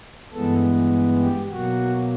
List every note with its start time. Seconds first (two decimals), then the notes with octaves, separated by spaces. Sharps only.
0.34 G2 E3 G#3 B3 A4
1.22 G4
1.51 B2 F#3 A#3 F#4